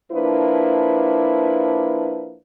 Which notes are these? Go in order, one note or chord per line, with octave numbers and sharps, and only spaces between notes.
F3 A#3 D4 E4 B4